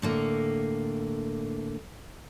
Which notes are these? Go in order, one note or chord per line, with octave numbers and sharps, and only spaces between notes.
A2 D3 A#3